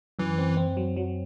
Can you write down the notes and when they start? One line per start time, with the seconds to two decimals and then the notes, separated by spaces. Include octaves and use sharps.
0.19 F#2 E3
0.38 C4
0.57 C4
0.77 F#3
0.96 F#3